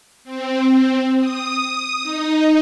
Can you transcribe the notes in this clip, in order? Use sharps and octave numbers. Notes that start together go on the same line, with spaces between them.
C4
D#6
D#4